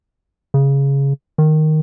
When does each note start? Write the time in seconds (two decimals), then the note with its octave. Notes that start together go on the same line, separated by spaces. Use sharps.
0.54 C#3
1.38 D#3